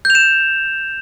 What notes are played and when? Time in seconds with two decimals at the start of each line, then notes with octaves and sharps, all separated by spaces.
0.05 G6
0.10 F7
0.15 E7